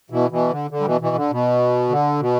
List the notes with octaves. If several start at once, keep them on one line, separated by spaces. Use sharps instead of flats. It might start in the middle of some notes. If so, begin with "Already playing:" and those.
B2 E3
B2 E3
D3
D3
G3
B2 E3
B2 E3
D3
B2
D3
B2